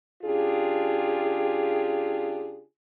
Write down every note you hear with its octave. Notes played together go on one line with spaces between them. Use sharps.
C#3 D4 F4 G4 G#4